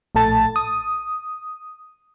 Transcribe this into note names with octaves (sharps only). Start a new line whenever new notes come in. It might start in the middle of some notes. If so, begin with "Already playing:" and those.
A#1 A2 A4 A5 A6
D#6